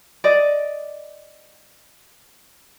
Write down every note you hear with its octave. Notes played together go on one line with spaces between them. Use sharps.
D5 D#5